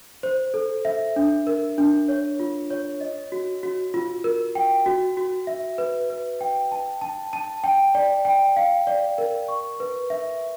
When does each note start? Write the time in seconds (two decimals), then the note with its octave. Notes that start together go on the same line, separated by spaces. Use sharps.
0.23 C5
0.54 A4
0.85 E5
1.16 D4
1.47 A#4
1.78 D4
2.08 C#5
2.40 F4
2.71 C#5
3.01 D#5
3.32 F#4
3.63 F#4
3.94 F4
4.24 A#4
4.55 G5
4.86 F#4
5.17 F#4
5.47 E5
5.78 B4
6.10 B4
6.41 G5
6.72 A5
7.02 A5
7.33 A5
7.64 G5
7.95 D5
8.25 G5
8.57 F5
8.87 D5
9.18 A#4
9.48 C#6
9.80 B4
10.10 E5